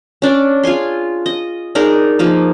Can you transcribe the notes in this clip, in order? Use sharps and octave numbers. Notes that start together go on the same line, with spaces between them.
C#4 D4 D5
F4 G#4 G#5 C6
D#5
D4 D#4 G#4 A#4
F3 A#3 D#4